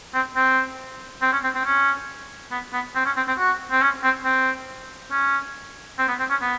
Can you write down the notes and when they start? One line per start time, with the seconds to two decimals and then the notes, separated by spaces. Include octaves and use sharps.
0.14 C4
0.36 C4
1.22 C4
1.32 C#4
1.44 C4
1.55 C4
1.65 C#4
2.51 B3
2.73 B3
2.96 C4
3.05 C#4
3.17 C4
3.27 C4
3.38 F#4
3.71 C4
3.82 C#4
4.03 C4
4.25 C4
5.11 C#4
5.98 C4
6.08 B3
6.19 C4
6.30 C#4
6.42 B3